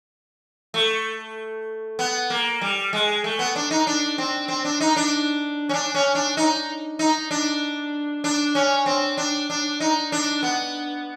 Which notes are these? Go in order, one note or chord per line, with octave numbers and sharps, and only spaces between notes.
A3
B3
A#3
G3
G#3
A3
B3
D4
D#4
D4
C4
C4
D4
D#4
D4
C#4
D4
C#4
D4
D#4
D#4
D4
D4
C#4
C4
D4
D4
D#4
D4
B3